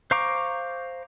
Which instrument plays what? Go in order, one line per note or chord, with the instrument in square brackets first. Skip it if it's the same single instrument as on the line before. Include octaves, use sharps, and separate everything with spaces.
[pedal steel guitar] C5 F5 A#5 C#6 D6